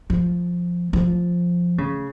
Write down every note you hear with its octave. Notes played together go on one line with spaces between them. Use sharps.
F3
F3
C#3